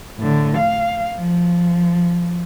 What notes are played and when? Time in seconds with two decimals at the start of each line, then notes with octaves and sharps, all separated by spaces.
0.18 A2 D3
0.57 F5
1.16 F3